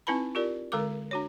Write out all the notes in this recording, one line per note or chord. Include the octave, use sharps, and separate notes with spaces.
C4 D#4 E4 B4 A5 B5
F4 G4 A#4 D5
D3 G#3 A4 A#4 D6
D4 F#4 C#5